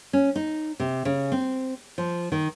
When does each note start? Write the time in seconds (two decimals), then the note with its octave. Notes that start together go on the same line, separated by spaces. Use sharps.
0.13 C#4
0.36 D#4
0.80 C3
1.05 C#3
1.32 C4
1.98 F3
2.32 D#3